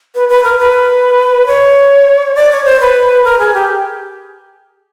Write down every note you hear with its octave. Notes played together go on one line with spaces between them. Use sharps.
B4
B4
A#4
B4
C#5
D5
C#5
C5
B4
A#4
G#4
G4